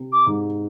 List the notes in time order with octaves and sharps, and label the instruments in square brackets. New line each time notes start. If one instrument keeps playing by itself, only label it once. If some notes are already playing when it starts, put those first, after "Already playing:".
Already playing: [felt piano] C3
[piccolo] D6
[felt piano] G#2